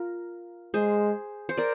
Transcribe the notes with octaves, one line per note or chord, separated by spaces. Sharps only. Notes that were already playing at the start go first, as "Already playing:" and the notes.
Already playing: F4 A#4
G#3 G#4 C5
C5
A#4 D5